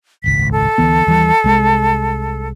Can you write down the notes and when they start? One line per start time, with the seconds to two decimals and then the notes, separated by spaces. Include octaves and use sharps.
0.24 D#1 G#1 C#2 B6
0.52 A4
0.78 D2 E3 B3
1.07 D#2 E3 G3
1.44 C2 G#3